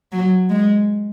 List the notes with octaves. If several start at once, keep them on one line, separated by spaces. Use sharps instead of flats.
F#3
G#3